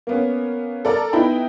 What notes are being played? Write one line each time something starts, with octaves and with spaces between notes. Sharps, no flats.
A#3 B3 C#4
A4 A#4 D5 A#5
B3 D#4 E4 G5 B5